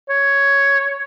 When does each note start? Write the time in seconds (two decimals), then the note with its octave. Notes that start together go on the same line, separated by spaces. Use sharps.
0.09 C#5